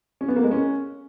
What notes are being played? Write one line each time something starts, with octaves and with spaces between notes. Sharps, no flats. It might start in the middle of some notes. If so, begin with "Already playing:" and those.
C#4
B3
A#3
G#3
C#4